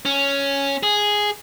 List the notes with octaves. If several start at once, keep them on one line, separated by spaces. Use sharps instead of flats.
C#4
G#4